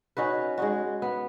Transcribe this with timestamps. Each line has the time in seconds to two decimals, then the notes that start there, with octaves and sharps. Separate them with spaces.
0.17 C#4 D#4 F#4 B4
0.58 G#3 D#4 F#4
1.02 B3